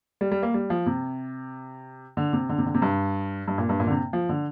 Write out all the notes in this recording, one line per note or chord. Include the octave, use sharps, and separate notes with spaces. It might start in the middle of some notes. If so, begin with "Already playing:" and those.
G3
G3
A#3
G3
F3
C3
D3
C3
D3
C3
D3
C3
G2
G2
A#2
G2
A#2
D3
C3
F3
D3